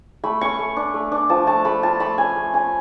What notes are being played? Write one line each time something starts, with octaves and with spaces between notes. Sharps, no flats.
A3 B5
C#4 C#6
A3
D4
A3
D4
F3 A5
A3 A5
A3 B5
F4 A5
A3 B5
C#4 G#5
A3
C#4 G#5